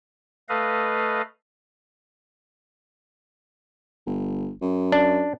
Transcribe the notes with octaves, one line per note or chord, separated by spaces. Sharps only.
A3 A4 B4 D#5 F5
G1
F#2
D4